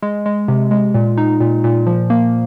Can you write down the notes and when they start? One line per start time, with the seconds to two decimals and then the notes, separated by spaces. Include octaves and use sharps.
0.02 G#3
0.26 G#3
0.48 C3
0.71 G#3
0.94 A#2
1.17 D#4
1.40 A#2
1.64 A#2
1.86 F3
2.10 A#3